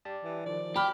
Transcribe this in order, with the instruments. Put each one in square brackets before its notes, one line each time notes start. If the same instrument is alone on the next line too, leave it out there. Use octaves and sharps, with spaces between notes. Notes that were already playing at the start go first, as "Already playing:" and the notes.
[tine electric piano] G4 D5 A5
[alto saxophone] E3
[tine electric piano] D#3 F3 [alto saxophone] D5
[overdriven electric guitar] G4 [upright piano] B5 F6